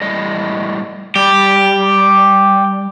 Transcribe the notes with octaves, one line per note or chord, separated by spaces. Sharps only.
A2 G3 D#5
G3 G4